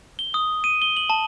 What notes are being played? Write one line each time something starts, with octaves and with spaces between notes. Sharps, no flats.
G7
D#6
D#7
G7
F#7
A5